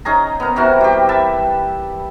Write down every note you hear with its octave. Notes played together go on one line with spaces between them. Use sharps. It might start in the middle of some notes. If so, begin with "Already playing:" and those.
C#4 D#4 G#4 A#5
B3 A#4
C3 E3 F#4 A#4
G3 G4
B4 E5 A5